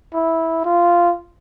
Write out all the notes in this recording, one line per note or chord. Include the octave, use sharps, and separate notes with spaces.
E4
F4